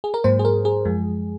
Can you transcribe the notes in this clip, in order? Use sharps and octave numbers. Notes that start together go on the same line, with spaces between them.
G#4
A#4
G#2 F#3 A#3 C5
G#4
A#4
G#4
F#2 F3 G#3